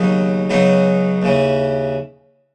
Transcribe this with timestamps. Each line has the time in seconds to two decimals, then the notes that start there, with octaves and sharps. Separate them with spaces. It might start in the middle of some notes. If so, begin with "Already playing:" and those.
Already playing: D#2 C#3 F#3 B3 D#4
0.50 C#2 C#3 F#3 B3 D#4
1.22 D#2 C#3 E3